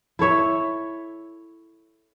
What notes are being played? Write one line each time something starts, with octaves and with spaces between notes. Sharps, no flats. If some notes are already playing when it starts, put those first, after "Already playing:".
E4 A4 C#5 E5